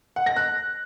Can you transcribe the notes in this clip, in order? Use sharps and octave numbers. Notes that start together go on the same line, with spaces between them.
F#5
A#6
F#6